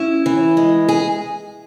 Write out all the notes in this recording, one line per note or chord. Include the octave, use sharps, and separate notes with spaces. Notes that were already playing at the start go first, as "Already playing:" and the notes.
Already playing: C#4 E4
E3
G#3
G#4